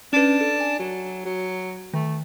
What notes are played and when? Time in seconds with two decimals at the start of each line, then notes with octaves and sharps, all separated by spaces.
0.13 C#4 D4 B4
0.41 A4
0.60 G#5
0.80 F#3
1.25 F#3
1.94 D#3 A3